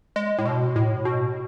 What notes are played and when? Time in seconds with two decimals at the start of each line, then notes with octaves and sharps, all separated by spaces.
0.16 G#3
0.38 A2
0.46 B2
0.76 A2
1.05 B2